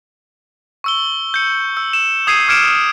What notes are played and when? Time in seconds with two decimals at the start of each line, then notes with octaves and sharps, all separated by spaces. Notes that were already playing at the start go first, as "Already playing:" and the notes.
0.84 C#6 E6 G7
1.34 G6 C#7
1.77 E6
1.93 E7
2.27 D#6 G#6 C7 C#7 D#7
2.48 D6 F6 G#6 C#7 D7 E7